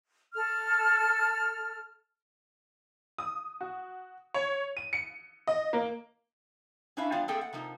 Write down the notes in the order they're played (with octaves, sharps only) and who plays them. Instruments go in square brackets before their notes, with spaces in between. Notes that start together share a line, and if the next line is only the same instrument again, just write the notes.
[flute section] A4 F6
[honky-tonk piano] D#6
F#4
C#5
D#7
C#7
D#5
A#3
[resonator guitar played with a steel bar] C#4 D4 E4 C#5 E5 F5
F3 G3 B3 D4 F4
A3 A#3 C4 G#4 A4 G5
F#5
C3 F3 A#3 D#4